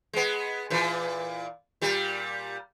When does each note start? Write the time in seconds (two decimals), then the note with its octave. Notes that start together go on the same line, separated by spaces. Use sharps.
0.13 G#3 B3
0.70 A#2 E3
1.82 A#2 G3